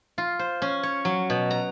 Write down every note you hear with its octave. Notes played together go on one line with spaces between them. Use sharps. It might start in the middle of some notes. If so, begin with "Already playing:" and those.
F4
C5
C#4
C#5
F#3
B2
A#5